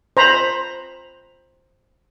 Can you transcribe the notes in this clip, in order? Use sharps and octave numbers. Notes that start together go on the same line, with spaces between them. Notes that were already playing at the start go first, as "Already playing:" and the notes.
C5 A#5 B5